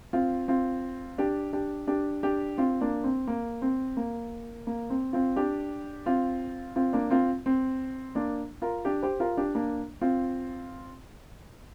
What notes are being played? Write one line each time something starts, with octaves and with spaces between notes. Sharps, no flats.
C4 F4
C4 F4
D4 G4
D4 G4
D4 G4
D4 G4
C4 F4
A#3 D4
C4
A#3
C4
A#3
A#3
C4
C4 F4
D4 G4
C4 F4
C4 F4
A#3 D4
C4 F4
C4
A#3 D4
F4 A#4
D4 G4
G4 C5
F4 A#4
D4 G4
A#3 D4
C4 F4